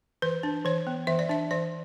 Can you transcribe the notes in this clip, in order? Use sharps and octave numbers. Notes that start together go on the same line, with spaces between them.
E3 B4
D4
E3 C#5
B3
E3 E5
D5
D4 E5
E3 D5